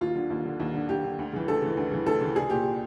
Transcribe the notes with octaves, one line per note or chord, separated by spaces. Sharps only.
D#2 F4
D3
D#2
D3
D#2
D3
D#2 G4
D3
D2
C#3 E3
D2 A4
C#3 E3
D2
C#3 E3
D2 A4
C#3 E3
C2 G#4
A#2 G4